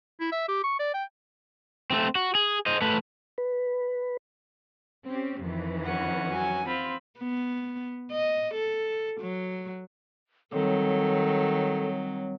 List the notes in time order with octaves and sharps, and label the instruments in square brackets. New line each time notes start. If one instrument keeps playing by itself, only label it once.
[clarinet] E4
E5
G4
C#6
D5
G5
[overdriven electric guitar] A3 C4
F#4
G#4
C5 D#5
A3 B4
[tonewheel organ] B4
[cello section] C4 C#4 G4
F2 D#3 E3
[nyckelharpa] C#4 F#5
[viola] F#3 G#5
[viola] C4 B5 [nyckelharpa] F4
[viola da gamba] B3
D#5
A4
F#3
[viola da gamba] D#3 F#3 [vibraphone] G3 C4 C#5 [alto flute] A4